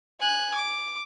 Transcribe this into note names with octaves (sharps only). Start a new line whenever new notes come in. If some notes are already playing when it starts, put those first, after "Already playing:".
G#5 F#6
D6